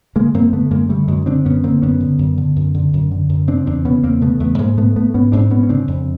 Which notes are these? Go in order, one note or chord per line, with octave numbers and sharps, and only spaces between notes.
D3 G#3 A#3
F#2 A#3 C4
D3 A3 B3
F#2 G#3 A#3
D3 G3 A3
F#2 F#3 G#3
D3 C4 D4
F#2 B3 C#4
D3 A#3 C4
F#2 B3 C#4
D3
F#2
D3
F#2
D3
F#2
D3
F#2
C#3 C4 D4
E2 C4 D4
C#3 B3 C#4
E2 A#3 C4
C#3 A3 B3
E2 A3 B3
G#2 G#3 A#3
G#2 A3 B3
G#2 A3 B3
G#2 B3 C#4
G#2 C4 D4
G#2 B3 C#4
C#4
C#3 C4 D4
F2